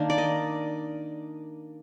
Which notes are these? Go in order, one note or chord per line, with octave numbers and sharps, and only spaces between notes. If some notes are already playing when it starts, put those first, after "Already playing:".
Already playing: D#3 A#3 D4
D5
D#5